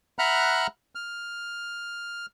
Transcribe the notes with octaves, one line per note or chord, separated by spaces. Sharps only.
E5 F#5 A#5 B5 F6 F#6
F6